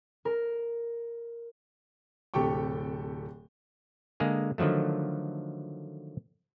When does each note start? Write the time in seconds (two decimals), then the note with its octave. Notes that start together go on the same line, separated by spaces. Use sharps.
0.25 A#4
2.34 D1 C3 G4 A4 G5 C#6
4.20 D3 G#3 A#3 G#4
4.58 D3 D#3 F3 F#3 A3